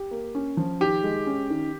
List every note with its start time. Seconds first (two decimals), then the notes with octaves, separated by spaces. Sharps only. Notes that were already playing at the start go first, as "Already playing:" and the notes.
Already playing: G4
0.11 A#3
0.35 C#4
0.57 F3
0.80 D#3 G4
1.03 G#3
1.26 C#4
1.50 D#3